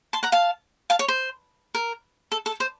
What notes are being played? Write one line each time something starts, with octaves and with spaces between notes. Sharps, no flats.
A5 C6
F#5 A#5
F5 A5
F5 A5
C#5
C5
A#4
A4
A4
C5